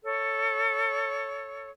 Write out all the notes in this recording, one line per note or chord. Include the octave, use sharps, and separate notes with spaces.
A4 C#5